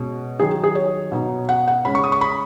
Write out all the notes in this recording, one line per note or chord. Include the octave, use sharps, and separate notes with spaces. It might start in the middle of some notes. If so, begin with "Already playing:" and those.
Already playing: B2 G#3 C#4
D#3 F#3 D#4 G#4
G#4
C#5
B2 B3 D#4
F#5
F#5
C#3 G#3 C#4 B5
C#6
D#6
C#6
B5